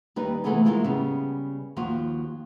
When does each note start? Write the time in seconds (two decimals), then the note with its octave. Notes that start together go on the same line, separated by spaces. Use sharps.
0.16 D#2 G3 D#4 B4
0.44 C3 E3 A3 B3 F4 G#4
0.65 E3 G#3 A#3 E4 F4
0.84 C#3 G3 B3
1.77 D#2 F3 F4 F#4